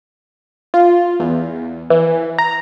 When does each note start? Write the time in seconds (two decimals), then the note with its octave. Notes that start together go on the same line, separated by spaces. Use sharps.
0.74 F4
1.20 E2
1.90 E3
2.38 A#5